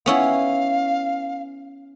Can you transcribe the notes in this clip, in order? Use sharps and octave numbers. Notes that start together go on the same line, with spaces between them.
B3 C#4 E4 F5